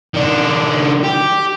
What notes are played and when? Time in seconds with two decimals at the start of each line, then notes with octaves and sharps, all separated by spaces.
0.14 D#3 D4
1.04 G4